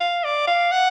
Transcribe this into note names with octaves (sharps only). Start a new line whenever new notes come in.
F5
D5
F5
F#5